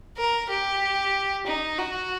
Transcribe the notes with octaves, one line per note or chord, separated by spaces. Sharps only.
A#4
G4
D#4
F#4